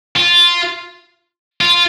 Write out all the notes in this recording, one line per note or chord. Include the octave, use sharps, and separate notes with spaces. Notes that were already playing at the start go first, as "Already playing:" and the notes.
F4
F4